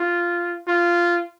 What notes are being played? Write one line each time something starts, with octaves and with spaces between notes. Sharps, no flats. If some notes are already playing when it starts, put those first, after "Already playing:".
Already playing: F4
F4